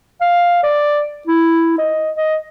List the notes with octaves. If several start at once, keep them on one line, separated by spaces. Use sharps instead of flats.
F5
D5
E4
D#5
D#5